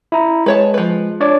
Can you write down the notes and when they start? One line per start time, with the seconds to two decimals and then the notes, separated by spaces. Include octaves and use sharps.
0.12 E4 A#5
0.46 G#3 B4 C#5 A5
0.74 F3 B4
1.20 D4 C#5 D5